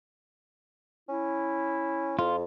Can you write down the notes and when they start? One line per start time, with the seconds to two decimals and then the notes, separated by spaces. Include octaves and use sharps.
1.09 C#4 E4
2.19 F2 F4